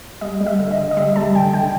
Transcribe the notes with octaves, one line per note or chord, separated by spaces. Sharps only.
G3 D#5
G3
E5
D3
D#5
D3
D#5
G3 E5
G3 A5
D3 G5
D3 G5